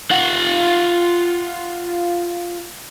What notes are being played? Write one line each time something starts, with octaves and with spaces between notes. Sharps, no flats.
F4 F#5